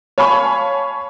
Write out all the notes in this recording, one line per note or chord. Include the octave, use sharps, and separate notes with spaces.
C#5 F5 G#5 A5 B5 C#6